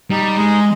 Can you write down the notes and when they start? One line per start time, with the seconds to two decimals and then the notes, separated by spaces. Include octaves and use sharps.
0.10 G3 D#4
0.37 G#3 D#5